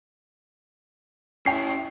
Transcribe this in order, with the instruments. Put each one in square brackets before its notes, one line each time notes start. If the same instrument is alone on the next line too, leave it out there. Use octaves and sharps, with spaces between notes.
[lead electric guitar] C#4 E4 [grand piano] G5 C7